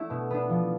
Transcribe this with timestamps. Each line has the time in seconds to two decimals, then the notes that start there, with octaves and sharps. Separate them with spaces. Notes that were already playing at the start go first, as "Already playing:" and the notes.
Already playing: A3 D4 E4
0.10 B2
0.30 B3 D4
0.49 F3